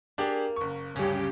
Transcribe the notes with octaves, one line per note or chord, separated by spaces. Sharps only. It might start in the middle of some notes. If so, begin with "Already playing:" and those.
A#3 D4 G4 G#4
F#1 C#6
D1 G2 C#3 C#4 G4